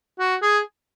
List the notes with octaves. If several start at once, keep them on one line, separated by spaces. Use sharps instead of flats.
F#4
G#4